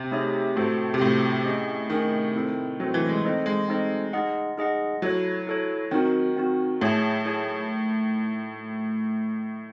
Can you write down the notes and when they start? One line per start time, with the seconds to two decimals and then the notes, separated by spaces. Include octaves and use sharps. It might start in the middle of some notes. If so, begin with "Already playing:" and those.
Already playing: C3
0.11 A3 D#4 G#4 C#5 E5
0.56 A2 F#4 A4 C5
0.94 C3
1.00 A2 F#4 A4 C5
1.45 C#4 G#4 D#5
1.90 D#3 C#4 G#4 D#5
2.35 C4 E4 A4 C5
2.80 F#3 C4 E4 A4 C5
2.94 E3
3.09 G#3
3.24 C4 D#4 A4 C5 D#5
3.46 G#3
3.68 C4 D#4 A4 C5 D#5
4.13 D#4 G#4 D#5 F#5
4.58 D#4 G#4 D#5 F#5
5.02 F#3 E4 A4 C#5
5.47 E4 A4 C#5
5.91 D#3 C4 D#4 F#4
6.37 C4 D#4 F#4
6.81 A2 E4 G#4 C#5 E5 A5
7.26 E4 G#4 C#5 E5 A5